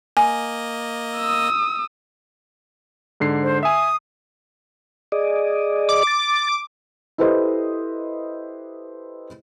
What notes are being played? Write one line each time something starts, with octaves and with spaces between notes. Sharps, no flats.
A#3 D#5 G#5
D#6 E6
G#2 D3 C7
C5
E5 G#5 D#6
G#4 D5 D#5
D6
A6
E4 G4 A4 B4 C5 D#5